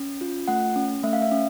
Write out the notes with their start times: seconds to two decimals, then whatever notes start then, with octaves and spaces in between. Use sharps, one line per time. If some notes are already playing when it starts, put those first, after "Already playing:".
Already playing: C#4
0.21 F4
0.48 A3 F#5
0.76 C#4
1.03 A3 E5
1.13 F5
1.22 E5
1.31 C#4